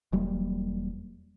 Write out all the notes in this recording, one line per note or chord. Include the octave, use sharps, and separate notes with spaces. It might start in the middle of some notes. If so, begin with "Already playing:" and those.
E1 F#3 G3 A#3